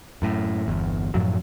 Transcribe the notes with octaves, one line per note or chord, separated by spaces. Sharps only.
F#2 A2
G1 E2
F#2 A2 F3 F#3